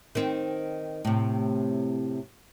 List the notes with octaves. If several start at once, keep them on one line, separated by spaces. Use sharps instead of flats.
D#3 C4
A2 C3